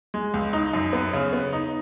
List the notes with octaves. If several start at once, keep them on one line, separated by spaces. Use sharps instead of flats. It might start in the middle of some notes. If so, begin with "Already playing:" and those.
G#3
C#2
D#4
F#2
B3
C#3
B3
D#4